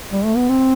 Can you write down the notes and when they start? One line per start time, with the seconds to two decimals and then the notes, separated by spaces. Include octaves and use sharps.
0.12 G3
0.25 A3
0.37 B3
0.49 C4